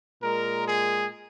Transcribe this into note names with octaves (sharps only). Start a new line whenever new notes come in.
A#2 G#3 A#4
G#4